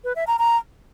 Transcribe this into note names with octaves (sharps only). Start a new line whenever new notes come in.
B4
E5
A#5
A#5